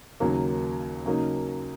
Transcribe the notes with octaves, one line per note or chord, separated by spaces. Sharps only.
D#2 C#3 F#3 A#3
C#3 F#3 A#3 D#4